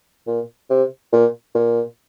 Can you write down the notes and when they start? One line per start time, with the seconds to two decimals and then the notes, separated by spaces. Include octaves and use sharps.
0.27 A#2
0.70 C3
1.12 A#2
1.55 A#2